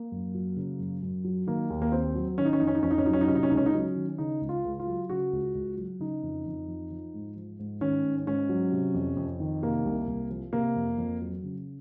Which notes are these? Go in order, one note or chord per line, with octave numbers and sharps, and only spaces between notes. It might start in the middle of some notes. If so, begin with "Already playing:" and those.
Already playing: A#3
F#2
F#3
C#3
F#2
F#2
F#3
D#3 A#3
D#2
A#3
D#2 C4
F#3
D#3 C#4
D#4
C#4
F2 D#4
C#4
D#4
F2 C#4
D#4
C#4
F#3 D#4
C#4
D#4
C3 C#4
D#4
C#4
C#2 D#4
C#4
D#4
F#3 C#4
D#3
C#3 D#4
C#2
F4
C#2
F4
F#3
C#3 F#4
C#2
C#2
F#3
C#3 D#4
F2
F2
F3
F3
G#2
F3
G#2
D#3 C#4
G#2
G#2 C#4
F#3
C3
F2
F2
D#3
C3 A#3
C2
C2
F3
C3 A#3
F2
F2
F#3
C#3